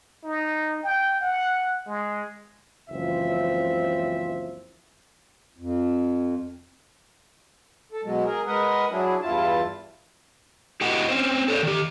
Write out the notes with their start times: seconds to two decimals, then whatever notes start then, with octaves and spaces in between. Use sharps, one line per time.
0.24 D#4
0.83 G5
1.21 F#5
1.87 G#3
2.90 F#1 C#2 E3 F3 C4 E5
5.58 F2
7.92 A4
8.04 B2 F#3 G#3
8.26 G#4 A#4
8.47 G#3 A#4 B4 D#5 F#5
8.91 F#3 D4 E4 G#4
9.22 E2 G2 E4 F4 A5
10.81 E4 F#4 G4 D#5 F#5
11.09 C4 C#4 C5
11.48 A4 C#5 D5
11.63 D#3 G4